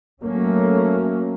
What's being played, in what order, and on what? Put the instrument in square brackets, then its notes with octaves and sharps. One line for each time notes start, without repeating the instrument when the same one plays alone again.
[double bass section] F#3 A3 A#3 C#4